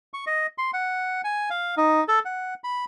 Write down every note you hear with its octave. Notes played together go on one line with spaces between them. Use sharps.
C#6
D#5
C6
F#5
G#5
F5
D#4
A4
F#5
B5